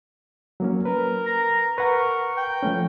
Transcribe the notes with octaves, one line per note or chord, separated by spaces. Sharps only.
F#3 A#3 C#4
A#4 B4
A#5
A#4 B4 F#5 C#6
G5
F3 A3 C#4